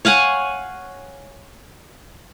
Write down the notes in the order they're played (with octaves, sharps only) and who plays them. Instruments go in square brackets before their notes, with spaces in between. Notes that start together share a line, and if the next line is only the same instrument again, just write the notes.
[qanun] C#5 F5 F#5 G#5